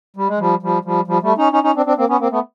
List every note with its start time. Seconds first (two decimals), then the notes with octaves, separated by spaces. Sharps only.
0.17 G3
0.28 G#3
0.39 F3 G3
0.63 F3 G3
0.84 F3 G3
1.07 F3 G3
1.22 G3 A3
1.38 C#4 D#4
1.52 C#4 D#4
1.63 C#4 D#4
1.75 C4 D4
1.86 C4 D4
1.97 A#3 C4
2.09 B3 C#4
2.20 A#3 C4
2.31 A3 B3